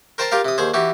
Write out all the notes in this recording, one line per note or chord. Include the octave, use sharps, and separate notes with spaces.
A#4 C5 G5 A5 A#5 C6
F4 G4 A#4 F5
C3 D#6
D#2 G#4 C5
E3 F#4 G4